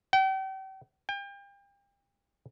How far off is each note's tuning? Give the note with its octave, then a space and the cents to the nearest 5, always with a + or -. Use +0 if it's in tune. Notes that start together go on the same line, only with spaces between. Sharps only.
G5 -40
G5 +35